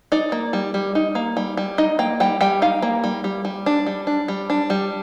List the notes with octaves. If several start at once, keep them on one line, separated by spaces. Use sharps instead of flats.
D#4 D5
A#3
G3
G3
D#4
A#3
G3
G3
D#4 D#5
A#3 G5
G3 G5
G3 G5
D#4 F5
A#3
G3
G3
G3
D4
G3
D4
G3
D4
G3